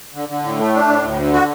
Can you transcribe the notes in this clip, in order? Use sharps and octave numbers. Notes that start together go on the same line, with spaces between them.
D3
D3
A2
A3
D4
A2
D2
D3
F#4